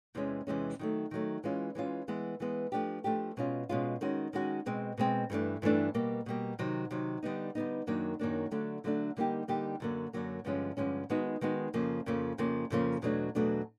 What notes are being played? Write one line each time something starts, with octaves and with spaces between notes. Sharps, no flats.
E2 C3 E3 G#3 C#4
E2 C3 E3 G#3 C#4
D#3 F#3 A3
D#3 F#3 A3
E3 G#3 C#4 F4
E3 G#3 C#4 F4
E3 G#3 B3
E3 G#3 B3
F3 A3 D4 G4
F3 A3 D4 G4
B2 G#3 C#4 F4
B2 G#3 C#4 F4
D#3 G#3 C#4 F#4
D#3 G#3 C#4 F#4
B2 G#3 C4
B2 G#3 C4
G2 E3 A3 D4
G2 E3 A3 D4
B2 G3 A#3
B2 G3 A#3
C3 D#3 F#3
C3 D#3 F#3
D3 G3 B3 D#4
D3 G3 B3 D#4
F#2 D#3 F#3 A#3 D4
F#2 D#3 F#3 A#3 D4
D3 F#3 A3 D4
D3 F#3 A3 D4
D3 G3 A#3 D#4 G4
D3 G3 A#3 D#4 G4
F#2 D3 F#3 A#3
F#2 D3 F#3 A#3
G2 D3 F3 G#3 C#4
G2 D3 F3 G#3 C#4
D#3 G#3 B3 D#4 F#4
D#3 G#3 B3 D#4 F#4
F2 C#3 F3 A#3
F2 C#3 F3 A#3
F2 C#3 F3 A#3
F2 C#3 F3 A#3
E2 B2 F#3 A3 D4
E2 B2 F#3 A3 D4